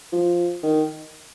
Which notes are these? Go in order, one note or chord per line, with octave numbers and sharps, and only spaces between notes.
F3
D#3